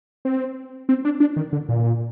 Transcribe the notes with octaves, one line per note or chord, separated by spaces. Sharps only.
C4
C4
D4
D4
D#3
D3
A#2